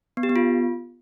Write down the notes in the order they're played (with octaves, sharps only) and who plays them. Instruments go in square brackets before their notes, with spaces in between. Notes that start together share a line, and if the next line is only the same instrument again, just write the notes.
[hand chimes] B3
G4
B3
F4